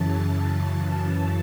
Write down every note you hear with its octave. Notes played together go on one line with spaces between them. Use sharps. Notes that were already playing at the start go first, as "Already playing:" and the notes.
Already playing: F#2 C#3 E3 A5